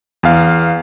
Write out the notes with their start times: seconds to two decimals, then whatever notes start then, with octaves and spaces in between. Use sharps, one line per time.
0.23 E2 F5